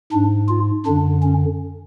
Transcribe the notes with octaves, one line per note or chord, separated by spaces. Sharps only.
G#2 D4
F4
F#2 D3 D4
C#4